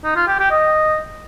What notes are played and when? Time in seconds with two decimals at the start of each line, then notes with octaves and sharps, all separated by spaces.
0.04 D#4
0.16 F4
0.27 G4
0.39 G4
0.51 D#5